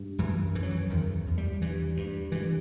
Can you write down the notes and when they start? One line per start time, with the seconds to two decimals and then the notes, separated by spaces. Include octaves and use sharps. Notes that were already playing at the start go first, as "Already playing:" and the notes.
Already playing: G2
0.18 F#2 E3
0.55 F#2 E3
0.63 F#3
0.70 E3
0.90 E2 D#3
1.26 E2
1.38 G3
1.62 G2 E3
1.97 G2
2.32 G2 E3